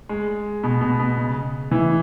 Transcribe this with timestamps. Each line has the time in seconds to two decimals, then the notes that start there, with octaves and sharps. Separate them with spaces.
0.09 G#3
0.63 B2
0.81 B2
0.99 B2
1.17 C#3
1.71 E3